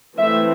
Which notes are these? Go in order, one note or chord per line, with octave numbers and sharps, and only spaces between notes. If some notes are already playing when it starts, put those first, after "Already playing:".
E3 A3 C4 E5